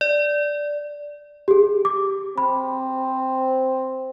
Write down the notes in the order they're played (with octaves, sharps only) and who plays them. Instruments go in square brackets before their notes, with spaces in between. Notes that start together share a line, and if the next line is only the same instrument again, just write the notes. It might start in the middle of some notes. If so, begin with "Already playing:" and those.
[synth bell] D5
[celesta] G4 G#4
D6
[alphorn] C4 [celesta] B5